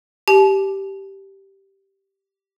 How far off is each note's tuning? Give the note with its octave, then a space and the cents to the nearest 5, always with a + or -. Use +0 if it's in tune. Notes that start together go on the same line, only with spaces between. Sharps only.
G4 -10 A5 -40